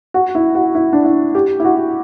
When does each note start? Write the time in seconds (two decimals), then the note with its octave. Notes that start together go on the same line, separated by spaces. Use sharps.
0.14 F#4
0.35 E4
0.55 F#4
0.75 E4
0.93 D4
1.04 E4
1.35 G4
1.60 E4
1.65 F#4